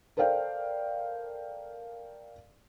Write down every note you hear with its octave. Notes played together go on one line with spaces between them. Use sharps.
A4 A#4 C5 D5 F5 G5